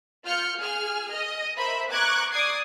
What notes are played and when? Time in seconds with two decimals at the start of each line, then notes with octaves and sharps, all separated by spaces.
0.25 F4 F6 G6 C#7
0.58 G#4 F6
1.14 D#5
1.56 A#4 C5 E5 B5
1.90 A#5 C#6 D6 F#6 G#6
2.32 D5 D6 D#6 G#6 C7